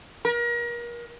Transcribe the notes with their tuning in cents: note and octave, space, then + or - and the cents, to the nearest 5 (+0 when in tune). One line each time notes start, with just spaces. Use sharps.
A#4 +35